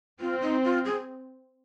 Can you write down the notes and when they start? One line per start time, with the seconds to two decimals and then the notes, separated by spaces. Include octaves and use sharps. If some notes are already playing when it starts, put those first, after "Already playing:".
0.20 C4 F4
0.42 D#4
0.64 F4
0.85 G#4